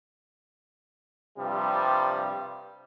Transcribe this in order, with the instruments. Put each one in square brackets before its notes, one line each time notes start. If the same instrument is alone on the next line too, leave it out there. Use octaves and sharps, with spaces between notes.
[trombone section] G2 C3 F3 G3